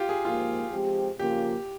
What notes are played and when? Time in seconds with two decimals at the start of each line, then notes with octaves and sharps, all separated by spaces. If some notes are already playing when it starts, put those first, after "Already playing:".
Already playing: F4 G4
0.09 G#4
0.25 G#2 F3 A#3 F4
0.71 F3 G#3 C4 G4
1.19 C#3 F3 A#3 F4 G4